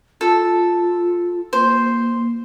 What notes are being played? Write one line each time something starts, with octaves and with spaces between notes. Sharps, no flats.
F4 A4
A#3 C5